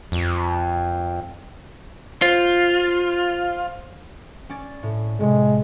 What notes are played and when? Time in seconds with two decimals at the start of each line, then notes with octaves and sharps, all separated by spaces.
0.12 F2
2.22 F4 C5
4.50 C#4 D5 A6
4.83 A2
5.20 A2 C3 G#3